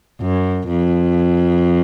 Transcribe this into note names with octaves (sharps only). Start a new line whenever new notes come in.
F#2
F2